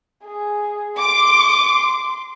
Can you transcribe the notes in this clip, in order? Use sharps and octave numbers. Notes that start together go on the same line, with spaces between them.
G#4
C6 D6